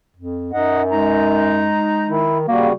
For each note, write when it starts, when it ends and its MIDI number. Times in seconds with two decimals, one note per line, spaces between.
0.17 0.53 41
0.53 1.80 42
0.53 0.82 63
0.53 0.82 75
0.53 0.82 78
0.91 2.33 56
0.91 2.33 63
0.91 2.07 82
2.08 2.44 51
2.08 2.38 64
2.48 2.72 49
2.48 2.72 55
2.48 2.68 58
2.48 2.72 66